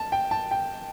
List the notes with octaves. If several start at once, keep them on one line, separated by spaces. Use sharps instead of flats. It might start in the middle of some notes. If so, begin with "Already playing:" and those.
Already playing: A5
G5
A5
G5